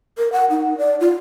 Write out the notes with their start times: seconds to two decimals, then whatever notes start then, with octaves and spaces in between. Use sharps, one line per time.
0.18 A#4
0.32 F#5
0.50 D#4
0.78 D5
1.00 F4